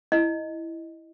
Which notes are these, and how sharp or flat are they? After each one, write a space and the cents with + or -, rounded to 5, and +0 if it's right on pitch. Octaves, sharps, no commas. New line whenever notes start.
E4 +0 D#5 +0